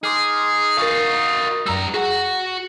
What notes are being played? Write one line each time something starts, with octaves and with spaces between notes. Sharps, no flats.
D#4 G#4 C6 D6 F6
F#4 A#4 F5 C#6
F#2 G3 A#5 E6
F#4 G#4 F#5